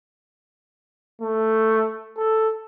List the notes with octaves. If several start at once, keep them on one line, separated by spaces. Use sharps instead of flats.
A3
A4